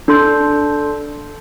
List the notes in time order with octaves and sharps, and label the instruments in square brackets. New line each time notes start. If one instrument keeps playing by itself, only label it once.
[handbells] D4 A4 C6 G6